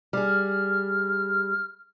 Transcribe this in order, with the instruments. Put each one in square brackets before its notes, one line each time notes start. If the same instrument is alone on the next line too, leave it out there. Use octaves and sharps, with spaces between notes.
[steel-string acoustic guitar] G3 G#4 [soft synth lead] F6